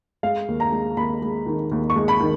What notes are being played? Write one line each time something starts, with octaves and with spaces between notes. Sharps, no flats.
G#3 F5
D#2
A#5
G#3
D#2 B5
G#3
D#3
D#2
C#6
G#3
B5
D#3